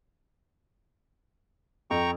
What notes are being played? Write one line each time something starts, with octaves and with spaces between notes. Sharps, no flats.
F2 G5 A#5 C#6